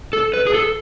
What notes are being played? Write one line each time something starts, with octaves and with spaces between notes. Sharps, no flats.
A4
B4
G#4
A4